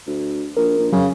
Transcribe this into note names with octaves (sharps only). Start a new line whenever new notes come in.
D2
A#1 A#4
A#1
F2 C#3 F#3